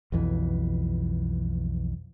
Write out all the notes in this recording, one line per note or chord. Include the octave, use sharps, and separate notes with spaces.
B1 F2 E3